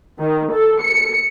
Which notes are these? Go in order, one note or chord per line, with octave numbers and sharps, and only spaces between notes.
D#3
A4
C#7